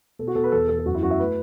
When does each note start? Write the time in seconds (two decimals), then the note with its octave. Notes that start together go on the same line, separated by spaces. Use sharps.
0.19 B2 A4
0.27 F#4
0.35 B2 A4
0.44 B4
0.52 E2 A4
0.69 E2 A4
0.79 A4
0.86 F#2 F#4
0.95 E4
1.03 F#2 F#4
1.10 E5
1.19 A3 B4